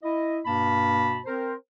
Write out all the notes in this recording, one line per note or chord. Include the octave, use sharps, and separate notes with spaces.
E4 D#5
G2 B2 A#3 A5 B5
C4 A#4 C5